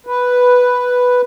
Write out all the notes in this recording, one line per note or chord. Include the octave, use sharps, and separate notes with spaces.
B4